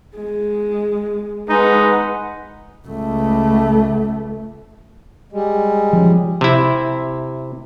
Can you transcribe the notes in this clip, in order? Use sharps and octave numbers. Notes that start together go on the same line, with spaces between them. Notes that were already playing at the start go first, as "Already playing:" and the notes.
G#3
G#3 D#4 B4 F#5
C#2 A3
G3 G#3
F3 C#4
C3 E4